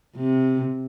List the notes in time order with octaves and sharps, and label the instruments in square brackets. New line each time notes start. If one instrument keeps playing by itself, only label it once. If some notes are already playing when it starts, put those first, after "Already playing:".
[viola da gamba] C3